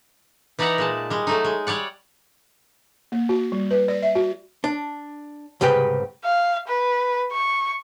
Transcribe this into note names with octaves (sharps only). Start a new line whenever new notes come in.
E3 D#4 D5 E5 F#5 A#5
A#2 G#3 A5
G3 G#3
F#3 A3 D#4
G#3
G3 C#5 D5 F#5
A#3
F#4
G3
B4
D5
E5
F#4
D4
C2 G#2 C#3 G4 B4 G5
F5
B4
C#6